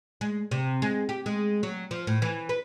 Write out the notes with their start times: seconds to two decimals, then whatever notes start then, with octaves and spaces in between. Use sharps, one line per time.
0.21 G#3
0.51 C3
0.82 G#3
1.09 G4
1.26 G#3
1.63 F#3
1.91 F3
2.07 A2
2.22 E3
2.49 B4